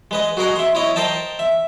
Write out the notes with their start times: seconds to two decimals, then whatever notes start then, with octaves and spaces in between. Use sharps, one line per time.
0.11 G#3 B4 D#5
0.37 F#4 G#4 A#4 D#5 F#5
0.55 E5 C6
0.75 E4 C#5 D#5
0.96 A#4 C5 D#5 G5 A5
1.39 E5